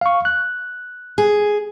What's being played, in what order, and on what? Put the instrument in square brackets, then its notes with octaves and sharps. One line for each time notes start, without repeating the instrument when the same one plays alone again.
[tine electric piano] F5 C#6
F#6
[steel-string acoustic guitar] G#4